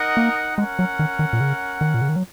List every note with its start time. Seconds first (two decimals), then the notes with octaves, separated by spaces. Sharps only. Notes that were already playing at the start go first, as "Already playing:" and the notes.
Already playing: D#4 A#4 D#5 F#5
0.17 A#3
0.58 G#3 C#4 A#4 F#5
0.79 F#3
0.99 D#3
1.19 D#3
1.33 A#2
1.41 C#3
1.81 D#3
1.94 A#2
2.02 C#3
2.09 D#3
2.16 F#3